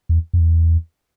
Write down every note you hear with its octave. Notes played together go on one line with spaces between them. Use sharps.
E2
F2
E2